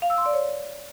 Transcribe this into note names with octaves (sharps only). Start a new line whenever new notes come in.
F5
E6
C6
D5
C#5